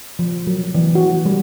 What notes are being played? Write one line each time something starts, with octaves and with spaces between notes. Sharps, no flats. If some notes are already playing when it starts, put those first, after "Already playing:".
F3
F#3
E3
F#4
G3